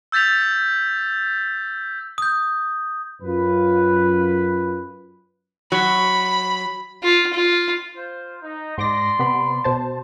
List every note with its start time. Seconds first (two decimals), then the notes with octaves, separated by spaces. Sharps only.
0.12 E6 G6 A6 B6 F7
2.18 D#6 G6
3.22 F#2 F4 B4
5.72 F#3 B5
7.03 F4
7.34 F4
7.97 F4 C5
8.43 D#4
8.78 G#2 D5 C6 D6 A#6
9.19 C3 B3 B5
9.64 B2 C5 A5